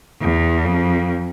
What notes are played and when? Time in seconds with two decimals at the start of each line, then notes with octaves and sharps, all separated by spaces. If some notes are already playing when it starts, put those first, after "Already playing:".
0.21 E2
0.64 F2